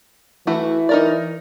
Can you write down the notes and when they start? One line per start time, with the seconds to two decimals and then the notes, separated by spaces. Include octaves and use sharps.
0.47 E3 A3 E4 F#4
0.89 D#4 A#4 D5